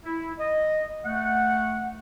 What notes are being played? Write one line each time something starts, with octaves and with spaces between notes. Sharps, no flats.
E4
D#5
A3 F#5